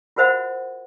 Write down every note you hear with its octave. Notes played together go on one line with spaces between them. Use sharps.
F4 F#4 A#4 C5 E5 F#5